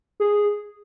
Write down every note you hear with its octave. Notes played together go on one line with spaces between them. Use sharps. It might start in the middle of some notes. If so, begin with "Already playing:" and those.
G#4